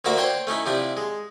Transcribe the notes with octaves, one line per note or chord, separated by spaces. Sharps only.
D2 D3 A#3 F#4 E5 D6
D4 C5 C#5 G5
A3 C#4 D#4 E4
C3 F3 D4 E4
G#3